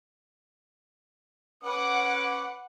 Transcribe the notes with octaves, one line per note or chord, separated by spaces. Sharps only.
C#4 B4 F#5 D6